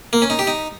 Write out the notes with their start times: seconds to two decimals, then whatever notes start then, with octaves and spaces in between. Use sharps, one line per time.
0.13 A#3
0.22 C#4
0.30 D#4
0.39 G4
0.47 D#4